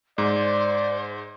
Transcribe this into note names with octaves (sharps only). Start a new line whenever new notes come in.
G#2 C5 D5